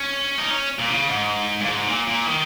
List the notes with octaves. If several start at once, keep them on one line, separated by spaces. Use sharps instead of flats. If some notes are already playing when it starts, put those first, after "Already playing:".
Already playing: C#4
D#4
C#4
A#2
C#3
G#2
A#2
G#2
A#2
A#2
D#3